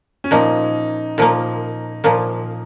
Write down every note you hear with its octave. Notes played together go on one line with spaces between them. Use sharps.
C#4
A#2 F3 A#3 D#4
A#2 F3 A#3
A#2 F3 A#3